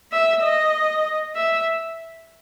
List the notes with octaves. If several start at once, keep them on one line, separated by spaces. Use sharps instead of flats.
E5
D#5
E5